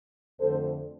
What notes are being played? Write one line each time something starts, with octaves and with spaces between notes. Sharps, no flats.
F2 D3 A3 A4 C5